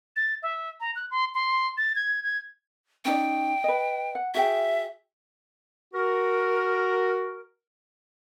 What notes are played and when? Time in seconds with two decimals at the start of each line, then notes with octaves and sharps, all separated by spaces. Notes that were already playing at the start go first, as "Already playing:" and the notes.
0.16 A6
0.42 E5
0.80 A#5
0.95 F#6
1.11 C6
1.34 C6
1.77 A6
1.95 G#6
2.23 G#6
3.05 C#4 D#4 D5 G5
3.64 B4 D#5
4.15 F#5
4.34 F#4 G#4 E5 G5
5.93 F#4 A#4